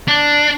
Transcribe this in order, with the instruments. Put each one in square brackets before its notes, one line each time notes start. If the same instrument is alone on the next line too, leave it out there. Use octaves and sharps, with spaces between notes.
[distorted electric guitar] D4